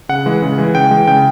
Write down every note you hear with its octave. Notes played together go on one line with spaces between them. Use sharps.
C#3 F#5
E3 G#3
C#3
E3 G#3
C#3 G5
E3 G#3
C#3 G5